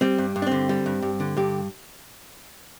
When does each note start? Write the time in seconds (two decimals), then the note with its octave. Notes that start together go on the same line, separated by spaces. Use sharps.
0.01 G3 C4
0.18 G2
0.36 G2
0.42 D4
0.47 D3 C4
0.69 G3
0.86 G2
1.02 G2
1.20 D3
1.37 G2 G4